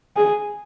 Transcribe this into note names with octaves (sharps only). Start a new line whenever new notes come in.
G#4